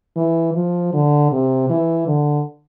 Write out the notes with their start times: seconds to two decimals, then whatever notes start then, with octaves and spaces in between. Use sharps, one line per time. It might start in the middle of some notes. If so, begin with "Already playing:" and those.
0.17 E3
0.55 F3
0.93 D3
1.32 C3
1.70 E3
2.07 D3